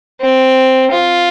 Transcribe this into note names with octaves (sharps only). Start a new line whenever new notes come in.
C4
F4